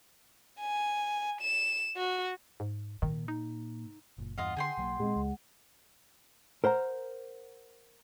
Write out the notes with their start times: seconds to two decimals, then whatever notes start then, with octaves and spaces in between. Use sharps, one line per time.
0.60 G#5
1.41 E7
1.97 F#4
2.60 G#2
3.02 A#2 D#3
3.28 D#4
4.18 F#1 A#2
4.38 E2 G2 F4 D#5 F5 F#5
4.57 D3 G#4 G5 C6
4.77 B1 F#3 A#3
4.99 A#2 G#3 C4
5.16 C#2
6.64 A#4 C5 F#5 A#5